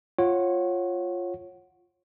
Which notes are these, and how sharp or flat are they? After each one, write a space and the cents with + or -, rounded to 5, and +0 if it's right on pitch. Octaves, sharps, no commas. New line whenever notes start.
F4 +0 C#5 -20 F#5 +0